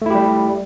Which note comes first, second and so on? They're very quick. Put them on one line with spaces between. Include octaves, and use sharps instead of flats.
A3 E4 G4 G3